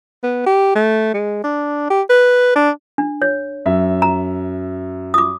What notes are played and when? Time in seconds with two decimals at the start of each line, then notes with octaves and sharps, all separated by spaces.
0.23 B3
0.46 G4
0.75 A3
1.14 G#3
1.44 D4
1.90 G4
2.10 B4
2.56 D4
2.98 D4
3.22 C#5
3.66 F#2 E5
4.02 A#5
5.14 D6 D#6